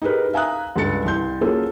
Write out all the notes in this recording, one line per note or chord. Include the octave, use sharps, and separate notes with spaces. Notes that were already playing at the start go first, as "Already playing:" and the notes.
D#4 G4 G#4 A#4 B4
E5 F5 G#5 A#5 D#6 F#6
C#2 G2 A4 A6 C#7
C2 C6 G6
F#3 A#3 C#4 F4 G#4 A4